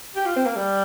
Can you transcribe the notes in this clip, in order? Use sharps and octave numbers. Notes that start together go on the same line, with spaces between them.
G4
F4
C4
A#3
G3